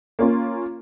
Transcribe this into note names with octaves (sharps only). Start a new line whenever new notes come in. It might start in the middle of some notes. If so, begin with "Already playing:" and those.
A#3 C#4 F4